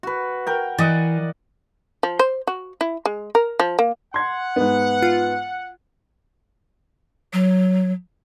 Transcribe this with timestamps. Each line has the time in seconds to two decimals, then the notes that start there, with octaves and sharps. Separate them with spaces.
0.03 F#4 B4
0.47 A#4 G5
0.78 E3 D5 D#5 F#5
2.03 F3
2.19 C5
2.47 F#4
2.81 E4
3.06 G#3
3.35 A#4
3.60 F3
3.79 A#3
4.14 F#5 C6 G#6
4.56 G#2 B3
5.03 F4
7.33 F#3